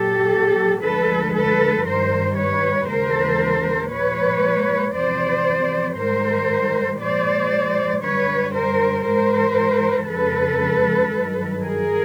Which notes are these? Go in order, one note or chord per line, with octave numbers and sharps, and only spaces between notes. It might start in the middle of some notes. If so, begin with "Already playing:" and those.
Already playing: A#2 F#3 G4 A4
D2 D3 F3 G#3 A4 B4
A4 B4
G2 D#3 G3 A#4 C5
B4 C#5
D#2 C#3 E3 G#3 A#4 C5
A#2 F3 G#3 B4 C#5
E2 C3 F3 C5 D5
G#2 D#3 G3 A#4 C5
A#2 F3 G#3 C5 D5
F#2 D3 G3 B4 C#5
A#4 C5
G#2 E3 G#3 A#4 C5
F2 C#3 F3 G#3 A4 B4
G2 D#3 F#3
G#4 A#4